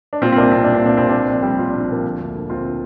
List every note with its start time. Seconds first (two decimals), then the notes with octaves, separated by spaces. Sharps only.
0.13 D4
0.21 A#2 C4 F4
0.32 C4
0.37 C2 A#3 D4
0.52 A#2 C4
0.64 C2 D4
0.74 C4
0.82 A#2 D4
0.97 C2 C4
1.09 A#2 D4
1.20 C4
1.29 A#1 D4
1.43 A#2 G3 C4
1.58 A#1 F4
1.70 A#2 D4
1.81 C4
1.88 A#1 A#3 D4
2.04 D3
2.19 D2
2.35 D3
2.50 D2 C4 F4
2.64 D3